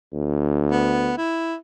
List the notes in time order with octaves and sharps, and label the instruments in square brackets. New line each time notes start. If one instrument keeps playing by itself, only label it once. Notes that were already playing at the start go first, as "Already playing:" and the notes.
[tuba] D2
[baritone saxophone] B3
E4